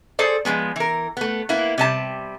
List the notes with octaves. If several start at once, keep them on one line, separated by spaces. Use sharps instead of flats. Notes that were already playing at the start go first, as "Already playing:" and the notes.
G#4 A4 C5 D5
F3 F#3 G#3 B3
E3 A#4
A3 B3
A#3 B3 E4
C3 G3 A5